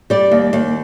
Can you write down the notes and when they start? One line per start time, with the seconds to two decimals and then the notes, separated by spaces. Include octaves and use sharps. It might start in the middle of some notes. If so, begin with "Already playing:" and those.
0.10 G3 D5
0.32 D#2
0.53 D#2